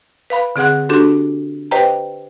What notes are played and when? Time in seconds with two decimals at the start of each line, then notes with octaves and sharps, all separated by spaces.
0.30 B4 F5 B5
0.56 D3 C4 G#4 F#5 F#6
0.89 D4 F#4 G4 A4 C6
1.71 G4 B4 C5 D#5 G5 A#5